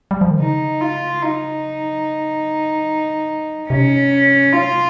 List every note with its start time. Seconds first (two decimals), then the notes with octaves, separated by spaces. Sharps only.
0.11 G3
0.21 F3
0.31 D#3
0.40 C#3 D#4
0.81 F4
1.23 D#4
3.70 C3 C#4
4.53 F4